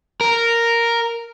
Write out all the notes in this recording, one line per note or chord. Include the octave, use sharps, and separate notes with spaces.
A#4